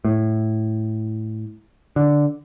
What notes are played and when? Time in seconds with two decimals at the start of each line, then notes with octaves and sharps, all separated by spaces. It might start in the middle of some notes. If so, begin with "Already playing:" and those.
0.05 A2
1.96 D3